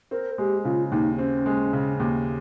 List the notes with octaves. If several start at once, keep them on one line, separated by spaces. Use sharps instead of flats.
C4 A#4
G#3 G4
C#3 F4
D#2 D#4
C4 C#4
G#3
C#3
D#2